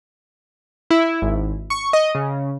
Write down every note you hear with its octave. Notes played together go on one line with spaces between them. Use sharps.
E4
G#1
C#6
D#5
C#3